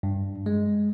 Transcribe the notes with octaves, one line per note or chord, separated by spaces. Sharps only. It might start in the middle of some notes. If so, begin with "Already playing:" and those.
G2
G#3